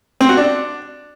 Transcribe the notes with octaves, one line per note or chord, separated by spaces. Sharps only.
C4
F#4
D4